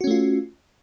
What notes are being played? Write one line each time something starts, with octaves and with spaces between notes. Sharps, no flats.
A3 C#4 F4 F#4